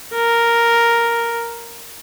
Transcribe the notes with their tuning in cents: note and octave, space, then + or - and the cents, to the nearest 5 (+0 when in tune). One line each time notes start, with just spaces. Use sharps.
A#4 +0